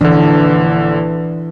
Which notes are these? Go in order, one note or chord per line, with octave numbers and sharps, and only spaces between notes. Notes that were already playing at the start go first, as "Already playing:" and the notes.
A#1 D3 E3 D4